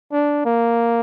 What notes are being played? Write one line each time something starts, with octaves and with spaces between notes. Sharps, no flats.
D4
A#3